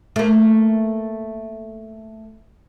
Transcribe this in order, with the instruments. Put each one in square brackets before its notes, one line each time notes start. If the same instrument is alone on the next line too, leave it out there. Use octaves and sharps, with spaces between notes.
[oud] A3 A#3